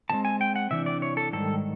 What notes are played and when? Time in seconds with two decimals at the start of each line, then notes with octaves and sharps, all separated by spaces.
0.10 E2 B2 G#3 C4 A5
0.25 G#5
0.41 G5
0.56 F#5
0.71 C3 E3 D4 E5
0.86 D5
1.02 C#5
1.17 A4
1.33 G#2 D#3 G3 A4